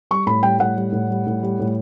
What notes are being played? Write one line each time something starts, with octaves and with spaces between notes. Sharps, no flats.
G3 C#6
A2 B5
G3 G5
A2 F#5
G3
A2
G3
A2
G3
A2